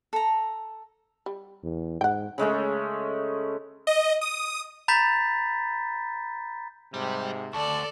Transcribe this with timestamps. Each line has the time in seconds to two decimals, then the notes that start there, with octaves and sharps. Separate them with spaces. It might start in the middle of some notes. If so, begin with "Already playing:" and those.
0.13 A4 A#5
1.26 G3
1.63 E2
2.01 G#2 F#5 G5
2.38 C#3 G#3 A3 C#4
3.87 D#5
4.21 D#6
4.88 A#5 B5 G6 A6 B6
6.94 G#2 C3 G3
7.53 D2 A4 D5 A5